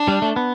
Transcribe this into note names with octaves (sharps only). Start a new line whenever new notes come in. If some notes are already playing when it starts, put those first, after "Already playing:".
Already playing: D4
G3
A3
B3